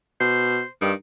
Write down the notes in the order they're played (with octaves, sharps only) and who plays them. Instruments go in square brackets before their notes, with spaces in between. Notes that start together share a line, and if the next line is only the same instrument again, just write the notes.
[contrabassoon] B2 [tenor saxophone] C5
[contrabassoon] G2 [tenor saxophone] D#3